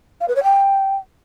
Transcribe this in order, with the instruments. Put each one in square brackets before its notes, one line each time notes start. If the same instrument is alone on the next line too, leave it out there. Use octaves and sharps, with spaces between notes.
[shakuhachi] F5
B4
C#5
G5